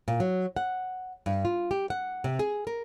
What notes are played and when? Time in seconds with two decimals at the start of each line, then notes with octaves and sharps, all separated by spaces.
0.08 A#2
0.20 F#3
0.56 F#5
1.26 G2
1.45 F4
1.71 G4
1.90 F#5
2.24 C3
2.39 G#4
2.67 A#4